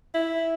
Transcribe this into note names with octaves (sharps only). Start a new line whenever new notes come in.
E4